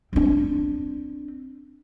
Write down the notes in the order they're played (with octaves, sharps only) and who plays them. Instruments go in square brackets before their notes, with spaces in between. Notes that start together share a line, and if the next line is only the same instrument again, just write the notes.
[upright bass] C4 D4